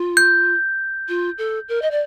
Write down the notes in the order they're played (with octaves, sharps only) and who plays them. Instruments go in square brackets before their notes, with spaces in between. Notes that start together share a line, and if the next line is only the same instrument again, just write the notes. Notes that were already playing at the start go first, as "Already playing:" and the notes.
Already playing: [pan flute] F4
[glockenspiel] G6
[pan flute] F4
A4
A#4
D#5
D5